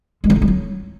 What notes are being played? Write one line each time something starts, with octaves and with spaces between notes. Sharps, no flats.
G#3
E3
D3
G#3
F#3